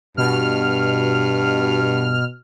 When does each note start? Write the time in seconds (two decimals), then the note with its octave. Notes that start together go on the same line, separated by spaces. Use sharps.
0.17 G2 B2 F6